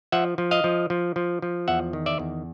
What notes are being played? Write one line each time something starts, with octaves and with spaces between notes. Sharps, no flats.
F3 E5 F#5
F3
D#5 F5
F3
F3
F3
F3
E2 E5 F#5
D#3
D5 E5
E2